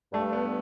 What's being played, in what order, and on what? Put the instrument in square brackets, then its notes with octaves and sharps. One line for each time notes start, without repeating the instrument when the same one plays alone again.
[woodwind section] G2 [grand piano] A3
[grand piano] B3